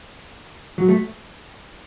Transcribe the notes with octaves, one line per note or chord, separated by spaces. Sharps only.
F#3
A3